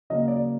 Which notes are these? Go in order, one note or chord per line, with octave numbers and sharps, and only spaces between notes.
C#3 F#3 A#3 D#5
D5